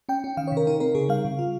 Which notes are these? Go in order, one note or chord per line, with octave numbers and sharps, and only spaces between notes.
C#4 G5
C#4
D#3 F5
C#5
C3 A#4
D#4 A#4
C4 A#4
C#3 G#4
G3 F5
C#3
F4